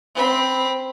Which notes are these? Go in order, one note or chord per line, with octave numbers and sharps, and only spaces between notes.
C4 B5